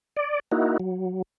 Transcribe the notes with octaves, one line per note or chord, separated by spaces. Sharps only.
D5
A#3 D#4 E4 F#4
F#3